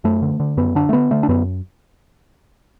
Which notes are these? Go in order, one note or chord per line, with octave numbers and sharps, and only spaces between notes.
F#2 A3
D3
D3
F#2 B3
D3 D4
A3
D3 B3
D3 A3
D4
F#2 B3